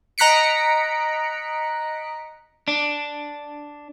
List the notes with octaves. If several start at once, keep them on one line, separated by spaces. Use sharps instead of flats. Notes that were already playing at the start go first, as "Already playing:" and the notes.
D#5 A#5 F#6 B6 C#7 D7
D4